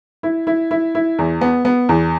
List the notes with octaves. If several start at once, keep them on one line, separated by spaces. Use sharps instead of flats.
E4
E4
E4
E4
E2
B3
B3
E2